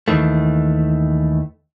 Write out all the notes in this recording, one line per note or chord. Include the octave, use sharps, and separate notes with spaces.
D#2 G#2 D#3 E3 A3